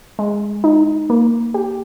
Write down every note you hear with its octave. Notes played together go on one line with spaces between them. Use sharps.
G#3
D#4
A#3
G4